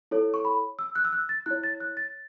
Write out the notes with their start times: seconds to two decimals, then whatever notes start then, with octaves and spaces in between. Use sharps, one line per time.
0.11 E4 A4 C#5
0.34 C#6
0.45 B5
0.79 E6
0.95 F#6
1.05 E6
1.13 F#6
1.29 A6
1.46 E4 C#5 F#6
1.63 A6
1.80 F#6
1.97 A6